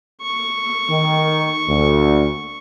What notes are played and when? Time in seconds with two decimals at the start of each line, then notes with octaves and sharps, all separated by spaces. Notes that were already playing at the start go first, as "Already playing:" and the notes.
0.22 C#6
0.90 D#3
1.68 D2